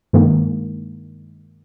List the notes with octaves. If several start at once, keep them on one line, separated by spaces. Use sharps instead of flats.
G2 D#3 G#3 A#3